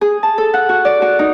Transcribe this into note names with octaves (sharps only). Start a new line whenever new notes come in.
G#4
A5
A4
F#5
F#4
D5
F#4
D#4